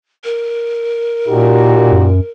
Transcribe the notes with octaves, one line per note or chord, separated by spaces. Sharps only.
A#4
A#2 D#4 F#4 G4
F#2